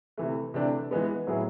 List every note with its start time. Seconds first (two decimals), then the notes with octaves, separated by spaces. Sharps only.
0.18 C3 E3 A3
0.54 C3 E3 A3 D4 G4
0.91 E3 G#3 B3
1.27 A2 F#3 B3 E4 G#4